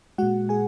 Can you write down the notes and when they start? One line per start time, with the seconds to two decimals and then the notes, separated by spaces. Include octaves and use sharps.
0.18 A#2 G#3 F#4 F#5
0.49 G#4 G#5